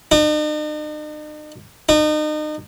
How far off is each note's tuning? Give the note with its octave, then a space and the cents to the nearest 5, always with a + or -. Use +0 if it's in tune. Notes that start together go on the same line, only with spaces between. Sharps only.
D#4 -45
D#4 -35